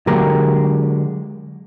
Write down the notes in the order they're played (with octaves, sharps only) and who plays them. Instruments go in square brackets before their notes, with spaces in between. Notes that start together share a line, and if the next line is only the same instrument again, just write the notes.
[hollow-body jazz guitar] D3 F#3 G#3 A#3 G4 A#4